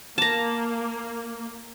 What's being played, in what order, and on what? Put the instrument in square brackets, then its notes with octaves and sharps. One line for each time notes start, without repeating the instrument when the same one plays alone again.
[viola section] A#3 [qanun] A5 A#5